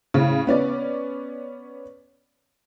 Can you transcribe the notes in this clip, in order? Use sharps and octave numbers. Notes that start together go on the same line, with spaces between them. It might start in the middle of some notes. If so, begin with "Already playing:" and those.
A2 C#3
B3 C#4 D5